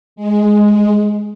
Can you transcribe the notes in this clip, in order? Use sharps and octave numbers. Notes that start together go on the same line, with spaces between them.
G#3